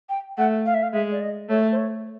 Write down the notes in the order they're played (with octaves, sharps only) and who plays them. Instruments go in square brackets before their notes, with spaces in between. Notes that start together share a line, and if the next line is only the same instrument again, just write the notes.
[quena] G5
[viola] A3 [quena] F#5
[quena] F5
E5
F5
[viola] G#3 [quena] E5
[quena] D5
D#5
[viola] A3 [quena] C#5
[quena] C5
C#5